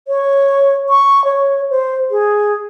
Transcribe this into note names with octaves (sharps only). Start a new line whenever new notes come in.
C#5
C#6
C#5
C5
G#4